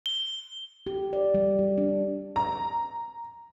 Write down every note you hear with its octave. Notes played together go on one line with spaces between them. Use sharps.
G7
G4
D5
G3
G3
D4
A#5